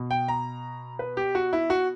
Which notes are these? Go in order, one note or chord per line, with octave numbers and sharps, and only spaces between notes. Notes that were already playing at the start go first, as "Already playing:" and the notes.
Already playing: B2
G5
A#5
B4
G4
F#4
E4
F#4